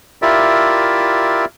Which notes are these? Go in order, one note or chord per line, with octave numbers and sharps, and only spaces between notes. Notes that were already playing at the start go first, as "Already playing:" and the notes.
E4 F4 G4 A#4 D5 E5